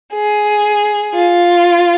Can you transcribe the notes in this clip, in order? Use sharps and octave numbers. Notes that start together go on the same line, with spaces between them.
G#4
F4